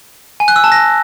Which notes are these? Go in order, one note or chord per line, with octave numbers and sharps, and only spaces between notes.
G#5
F#6
E6
A5
A#6